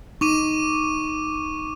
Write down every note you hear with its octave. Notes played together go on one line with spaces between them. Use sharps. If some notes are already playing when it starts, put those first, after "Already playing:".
D#4 C#6 D6 D#7